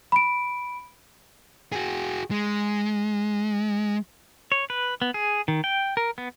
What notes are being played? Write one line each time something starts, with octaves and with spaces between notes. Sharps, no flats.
B5 D7
F#4 G#4
G#3
C#5
B4
B3
G#4
D#3
G5
A#4
B3